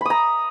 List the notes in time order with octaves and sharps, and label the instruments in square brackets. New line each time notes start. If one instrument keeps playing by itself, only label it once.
[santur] B5
D#6
A#5